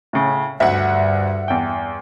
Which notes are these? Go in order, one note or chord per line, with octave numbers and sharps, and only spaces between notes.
A2 C#3
D2 G2 E5 F#5
E2 G5